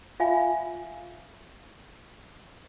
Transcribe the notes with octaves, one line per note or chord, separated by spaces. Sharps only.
F4 E5 F5 G#5 B5